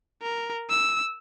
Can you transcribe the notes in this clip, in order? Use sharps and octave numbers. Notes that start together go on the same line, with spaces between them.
A#4
E6